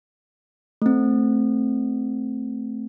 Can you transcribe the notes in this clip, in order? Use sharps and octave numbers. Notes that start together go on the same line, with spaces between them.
A3 C4